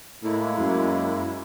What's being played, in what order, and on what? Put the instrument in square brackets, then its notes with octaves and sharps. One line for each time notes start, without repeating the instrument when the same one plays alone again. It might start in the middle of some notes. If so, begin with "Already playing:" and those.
[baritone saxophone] A2 [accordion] G#3 A#3 E4
[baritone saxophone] F#2